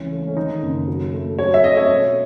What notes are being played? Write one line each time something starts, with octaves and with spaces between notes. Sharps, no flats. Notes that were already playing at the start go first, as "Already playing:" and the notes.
Already playing: C#2 E3 C#4
A3
C#4
D#3 D#4
F#1
F#3
A3
F#3 C#5
E5
A3 D#5
C#5
B2